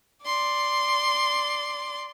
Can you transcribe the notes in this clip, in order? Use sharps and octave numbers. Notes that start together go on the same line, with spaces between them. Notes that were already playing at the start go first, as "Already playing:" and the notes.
D5 C6